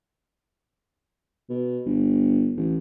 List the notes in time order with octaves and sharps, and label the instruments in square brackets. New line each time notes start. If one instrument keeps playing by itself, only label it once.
[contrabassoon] B2
G1
A1